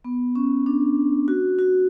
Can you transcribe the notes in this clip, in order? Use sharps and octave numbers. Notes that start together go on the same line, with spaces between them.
B3
C#4
D4
F#4
F#4